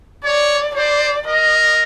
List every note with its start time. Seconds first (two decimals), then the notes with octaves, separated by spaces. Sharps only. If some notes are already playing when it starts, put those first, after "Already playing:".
0.25 C#5 D5
0.75 C5 D5
1.26 A#4 D#5